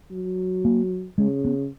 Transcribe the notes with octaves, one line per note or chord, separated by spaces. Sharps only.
F#3
A#3
C#3 G#3
B3